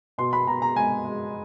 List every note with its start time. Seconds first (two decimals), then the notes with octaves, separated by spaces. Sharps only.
0.18 B2 C6
0.33 B5
0.47 B2 A#5
0.62 A#5
0.76 G#3 G#5
1.05 G#3